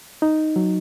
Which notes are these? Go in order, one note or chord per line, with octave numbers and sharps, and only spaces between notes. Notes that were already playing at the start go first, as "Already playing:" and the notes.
D#4
F#3